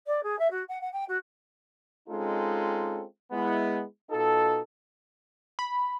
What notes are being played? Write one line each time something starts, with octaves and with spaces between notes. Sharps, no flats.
D5
G#4
E5
F#4
F#5
F#5
G5
F#4
G#3 C4 C#4 D#4 F4 A4
G#3 B3 E4
B2 D#4 F4 A4
B5